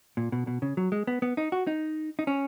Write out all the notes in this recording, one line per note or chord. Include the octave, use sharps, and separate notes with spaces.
A#2
B2
B2
C#3
F#3
G#3
B3
B3
D#4
F#4
D#4
D#4
C#4